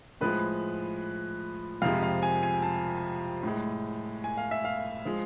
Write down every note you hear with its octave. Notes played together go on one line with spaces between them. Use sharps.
A2 F3 G#3 B4
F2 C3 F3 G#3 F5
F5
G#5
G#5
A5
A2 G#3
G#5
F5
E5
F5
F3 G#3